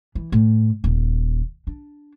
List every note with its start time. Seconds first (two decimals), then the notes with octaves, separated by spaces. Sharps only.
0.15 E3
0.32 A2
0.84 D#1
1.67 D4